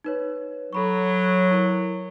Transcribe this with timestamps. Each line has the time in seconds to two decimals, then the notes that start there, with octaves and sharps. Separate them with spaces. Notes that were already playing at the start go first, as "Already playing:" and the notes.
0.04 D#4 B4 C#5
0.73 F#3 A4 B5 C#6
1.51 E4 A#4 C#5